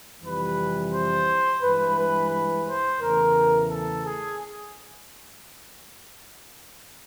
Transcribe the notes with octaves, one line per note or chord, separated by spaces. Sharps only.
F2 C3 E3 G3 B4
C5
G2 E3 G#3 B4
B4
B4
C5
E2 C#3 E3 A3 A#4
A4
G#4